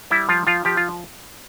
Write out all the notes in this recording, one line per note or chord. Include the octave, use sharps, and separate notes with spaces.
G3 E4
F3 F4
F3 F4
F3 G4
F4